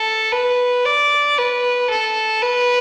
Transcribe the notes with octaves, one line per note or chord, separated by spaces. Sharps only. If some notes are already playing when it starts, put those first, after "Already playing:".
Already playing: A4
B4
D5
B4
A4
B4